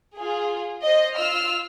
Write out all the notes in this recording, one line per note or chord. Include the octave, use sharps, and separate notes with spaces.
F4 G#4
C5 D#5
F4 E6 F6